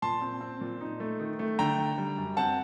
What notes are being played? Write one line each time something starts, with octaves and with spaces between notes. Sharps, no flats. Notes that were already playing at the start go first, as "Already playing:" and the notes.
A#2 A5 C6
C4
C4
A#2
D#4
A3
D#3
A3
D3 G5 A#5
D3
G3
F#2
C4 F#5 A5